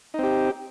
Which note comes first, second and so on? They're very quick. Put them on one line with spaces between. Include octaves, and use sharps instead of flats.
D#4 C4 G4